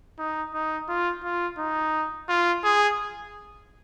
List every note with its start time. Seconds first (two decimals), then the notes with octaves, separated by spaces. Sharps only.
0.18 D#4
0.54 D#4
0.89 F4
1.23 F4
1.58 D#4
2.29 F4
2.64 G#4